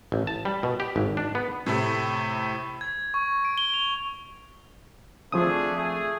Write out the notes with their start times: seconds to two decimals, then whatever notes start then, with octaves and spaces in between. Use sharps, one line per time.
0.12 A1
0.27 A5
0.45 G3
0.63 B2
0.80 G4
0.96 G#1
1.17 D4
1.35 B3
1.66 A2 C3 A3
2.81 G#6
3.14 C#6
3.45 D7
3.58 G7
3.74 F7
5.32 F3 A3 C4 D4 G#4 D#6
5.76 A3 G#4